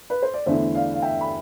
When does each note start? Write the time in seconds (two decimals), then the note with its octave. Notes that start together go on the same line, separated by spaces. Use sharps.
0.10 B4
0.22 C5
0.34 D5
0.46 E2 D3 A3 E4 C5 E5
0.74 D5 F5
0.93 F5
1.02 E5 G5
1.21 B5